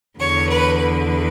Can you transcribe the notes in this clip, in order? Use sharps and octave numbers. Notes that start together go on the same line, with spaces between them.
E2 D3 C#5
B4
B4